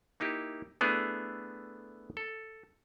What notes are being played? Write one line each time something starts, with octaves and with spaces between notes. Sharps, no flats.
A#3 D#4 E4 G4
A3 B3 D4 E4 G#4
A4